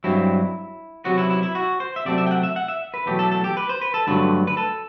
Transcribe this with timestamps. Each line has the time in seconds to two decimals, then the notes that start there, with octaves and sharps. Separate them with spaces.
0.04 G2 F#3 C4 E4
1.05 C3 F#3 B3 F#4
1.18 E4
1.30 E4
1.43 E4
1.55 F#4
1.80 C5
1.96 E5
2.05 C3 F#3 A3 C4 D5
2.18 E5
2.26 G5
2.31 F#5
2.43 E5
2.56 F#5
2.68 E5
2.94 B4
3.06 E2 B2 F#3 A3 G4
3.19 A4
3.31 A4
3.44 G4
3.57 B4
3.69 C5
3.81 B4
3.94 A4
4.07 G2 D3 F#3 A3 B4
4.47 B4
4.57 A4